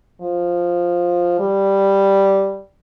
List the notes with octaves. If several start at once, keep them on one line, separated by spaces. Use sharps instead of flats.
F3
G3